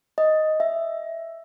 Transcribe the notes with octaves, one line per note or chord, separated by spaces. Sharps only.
D#5
E5